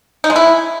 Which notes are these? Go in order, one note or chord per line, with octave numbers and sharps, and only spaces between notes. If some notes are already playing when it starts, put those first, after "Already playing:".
D#4
G#3
E4